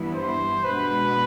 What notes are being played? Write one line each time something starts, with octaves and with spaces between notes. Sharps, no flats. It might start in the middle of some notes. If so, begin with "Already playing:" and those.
Already playing: G2 E3 G3 B3 E4
C5
B2 G#3 B3 D4 B4